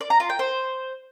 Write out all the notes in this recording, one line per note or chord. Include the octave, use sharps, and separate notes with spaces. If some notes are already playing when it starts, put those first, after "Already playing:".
D5
A#5
F4
G5
C5